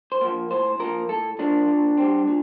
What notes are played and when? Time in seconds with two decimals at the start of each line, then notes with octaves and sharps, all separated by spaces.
0.12 C5
0.21 F3 A#3
0.51 A2 C5
0.80 F3 A#3 A#4
1.09 A2 A4
1.39 F3 A#3 D4
1.68 A#2
1.97 G3 C4
2.27 A#2